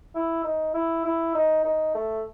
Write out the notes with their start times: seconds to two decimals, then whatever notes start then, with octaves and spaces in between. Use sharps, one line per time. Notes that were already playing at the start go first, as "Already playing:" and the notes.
0.15 E4
0.44 D#4
0.74 E4
1.05 E4
1.35 D#4
1.64 D#4
1.94 A3